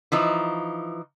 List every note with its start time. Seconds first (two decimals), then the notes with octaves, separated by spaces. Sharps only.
0.12 E3 F3 D#4